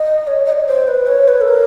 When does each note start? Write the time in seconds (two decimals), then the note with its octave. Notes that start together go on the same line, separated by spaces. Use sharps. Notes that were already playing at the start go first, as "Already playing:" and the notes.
Already playing: D#5
0.27 C#5
0.45 D#5
0.52 D5
0.60 C#5
0.67 C5
0.88 B4
1.07 C#5
1.28 B4
1.41 A4
1.48 A#4